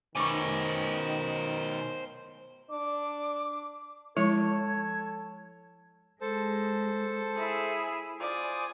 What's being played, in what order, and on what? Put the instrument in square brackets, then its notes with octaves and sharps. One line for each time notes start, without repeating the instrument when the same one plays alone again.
[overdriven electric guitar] B2 C#4 [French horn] D#3 [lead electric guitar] C5 G#5 [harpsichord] D5 C#6
[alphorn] D4 [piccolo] D6
[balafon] F3 G#3 E4 [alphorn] A4 [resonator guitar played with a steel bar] C#5 [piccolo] G#6
[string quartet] G#3 [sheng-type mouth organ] A4 C5 A5
[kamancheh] E4 [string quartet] G#4 E5
[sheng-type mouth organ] F4 C5 [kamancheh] D5 [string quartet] G#5 D#6